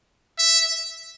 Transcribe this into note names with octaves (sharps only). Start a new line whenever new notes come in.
E5